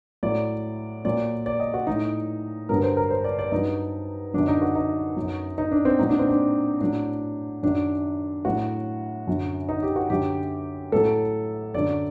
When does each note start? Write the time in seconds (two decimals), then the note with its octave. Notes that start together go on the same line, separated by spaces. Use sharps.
0.23 A2 F#3 D5
1.05 A#2 F#3 D5
1.46 D5
1.60 D#5
1.74 F#4
1.87 A2 F#3 D#4
2.69 G2 D3 F#3 A#4
2.83 C5
2.97 A#4
3.11 C5
3.24 D5
3.39 D5
3.52 G2 F#3 D#4
4.34 F#2 D3 F#3 D4
4.48 D#4
4.61 F#4
4.75 D#4
5.17 F#2 F#3
5.58 D#4
5.72 D4
5.85 C4
5.99 A#2 F#3 D#4
6.09 D4
6.19 C4
6.29 D4
6.81 A2 F#3 D4
7.63 F#2 D#3 F#3 D4
8.45 A2 F#3 F#4
9.27 F#2 D3 F#3
9.69 D#4
9.83 G4
9.96 F#4
10.10 F#2 D3 F#3 G4
10.92 A2 F#3 A4
11.74 F#2 D3 F#3 D5